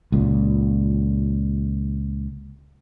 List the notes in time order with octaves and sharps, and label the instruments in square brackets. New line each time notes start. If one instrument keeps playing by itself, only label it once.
[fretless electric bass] C#2 A#2